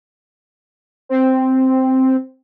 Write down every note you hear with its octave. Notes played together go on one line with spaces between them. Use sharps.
C4